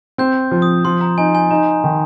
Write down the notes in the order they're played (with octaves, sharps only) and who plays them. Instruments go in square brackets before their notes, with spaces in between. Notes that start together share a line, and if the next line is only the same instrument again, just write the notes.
[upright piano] C4 [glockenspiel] G6
[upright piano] F3
[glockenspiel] D#6
[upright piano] F3 [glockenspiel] C6
[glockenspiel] A#5
[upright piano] D#4 [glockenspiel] G#5
[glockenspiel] G#5
[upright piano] D#4 [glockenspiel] A#5
[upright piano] D#3